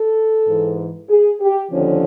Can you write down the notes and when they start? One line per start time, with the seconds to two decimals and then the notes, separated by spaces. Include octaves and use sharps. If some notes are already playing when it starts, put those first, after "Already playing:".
Already playing: A4
0.48 G#2 E3
1.09 G#4
1.40 G4
1.71 D#2 D3 F3 C#4